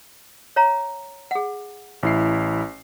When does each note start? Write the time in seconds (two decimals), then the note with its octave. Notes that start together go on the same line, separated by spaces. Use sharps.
0.56 C#5 F5 A#5
1.31 G#4 F#5
2.03 A1 E4 C7